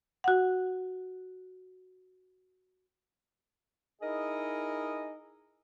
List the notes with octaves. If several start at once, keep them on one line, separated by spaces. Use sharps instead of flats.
F#4 F#5
D#4 E4 G#4 A#4 D#5